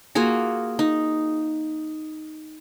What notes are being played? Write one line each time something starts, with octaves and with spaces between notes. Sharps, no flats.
A#3 F4 F#4 G#4
D#4